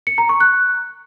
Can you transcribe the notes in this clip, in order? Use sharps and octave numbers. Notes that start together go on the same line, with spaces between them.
C#7
A#5
C#6
F#6